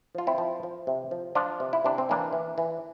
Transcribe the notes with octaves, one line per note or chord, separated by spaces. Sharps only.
F3 F4
C4 E4
F3
F3
C3
F3
F3 D4 F4
C3
E4
C3 D4
C4
E3 A#3 D4
E3
E3